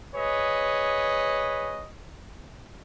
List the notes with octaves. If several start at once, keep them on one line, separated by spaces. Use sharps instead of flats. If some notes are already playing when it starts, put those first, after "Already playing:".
G#4 B4 C#5 D#5